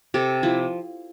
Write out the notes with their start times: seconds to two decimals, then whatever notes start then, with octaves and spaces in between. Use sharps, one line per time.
0.14 C3 G4 A4
0.43 F3 E4